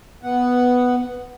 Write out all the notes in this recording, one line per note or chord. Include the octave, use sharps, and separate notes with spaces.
B3 F#5